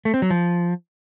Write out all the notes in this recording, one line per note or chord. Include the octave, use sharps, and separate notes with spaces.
A3
C4
F#3
F3